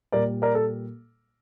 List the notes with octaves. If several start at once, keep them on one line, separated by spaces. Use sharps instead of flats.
A#2 G3 A#4 D5
A#4 D5
A4